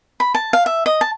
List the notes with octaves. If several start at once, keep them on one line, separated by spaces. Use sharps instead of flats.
B5
A5
F5
E5
D#5
A5